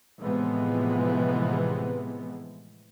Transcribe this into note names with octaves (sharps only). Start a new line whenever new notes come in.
A2 C3 E3 F3 G#3 B3